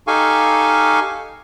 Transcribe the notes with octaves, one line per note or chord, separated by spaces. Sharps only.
D#4 G4 A4 F5 G#5 C#6